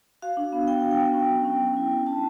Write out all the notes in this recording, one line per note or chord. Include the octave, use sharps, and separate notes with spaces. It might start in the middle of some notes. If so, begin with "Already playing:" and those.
F#4 F5
D4
B3
B3 G5
F#4
G5
B3
C#4
F#3
C#4
F#3
E4
E4
D4 A5